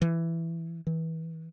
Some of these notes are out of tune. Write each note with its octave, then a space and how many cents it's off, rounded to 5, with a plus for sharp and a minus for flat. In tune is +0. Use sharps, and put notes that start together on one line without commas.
E3 +10
E3 -25